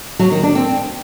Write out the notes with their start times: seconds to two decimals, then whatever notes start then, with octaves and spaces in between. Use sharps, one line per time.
0.19 F#3
0.31 D#3
0.43 D4
0.55 C4